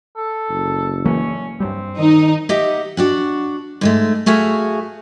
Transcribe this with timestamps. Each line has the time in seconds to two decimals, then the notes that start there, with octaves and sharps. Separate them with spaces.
0.16 A4
0.49 F#1
1.05 E3 F#3 A#3 C#4
1.60 G2 F#3 G3 C4
1.98 D#3 D#4
2.49 G4 D#5 E5 F#5
2.97 D4 F#4 F#5
3.81 G#2 G#3 A3
4.26 A3 F#4 G#4 E5 F5